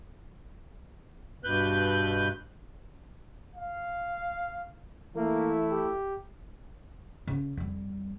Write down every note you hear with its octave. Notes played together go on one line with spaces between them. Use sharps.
G2 B2 B4 F#6 G6
F5
E3 A3 A#3 E4
G4
C#3 C#4
F2 G3